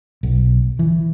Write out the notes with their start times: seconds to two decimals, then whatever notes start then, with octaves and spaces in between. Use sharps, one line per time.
0.23 B1
0.79 E3